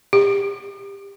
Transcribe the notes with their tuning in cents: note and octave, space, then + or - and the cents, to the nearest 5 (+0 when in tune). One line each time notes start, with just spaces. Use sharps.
G4 +25